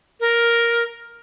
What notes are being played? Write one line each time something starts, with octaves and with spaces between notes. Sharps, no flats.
A#4